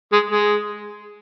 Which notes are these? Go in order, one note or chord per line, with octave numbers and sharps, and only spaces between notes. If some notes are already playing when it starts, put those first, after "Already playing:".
G#3
G#3